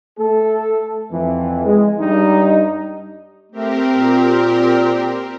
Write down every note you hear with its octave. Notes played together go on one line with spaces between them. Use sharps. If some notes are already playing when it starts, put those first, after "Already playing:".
A3 A4
F2 E3
G#3
G2 G3 D#4
A3 C4 G4 A#4
A#2